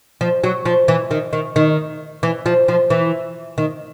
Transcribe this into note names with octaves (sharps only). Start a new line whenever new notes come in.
F3
F#3
F3
E3
D#3
D#3
D#3
E3
F3
F3
E3
D#3